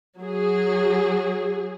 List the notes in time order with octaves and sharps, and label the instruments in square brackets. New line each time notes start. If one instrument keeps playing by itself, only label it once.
[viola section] F#3 G#4